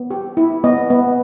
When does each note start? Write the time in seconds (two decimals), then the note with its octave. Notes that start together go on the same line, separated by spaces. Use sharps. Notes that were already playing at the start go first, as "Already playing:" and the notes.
Already playing: B3
0.11 G4
0.37 E4
0.64 B3 D#5
0.90 B3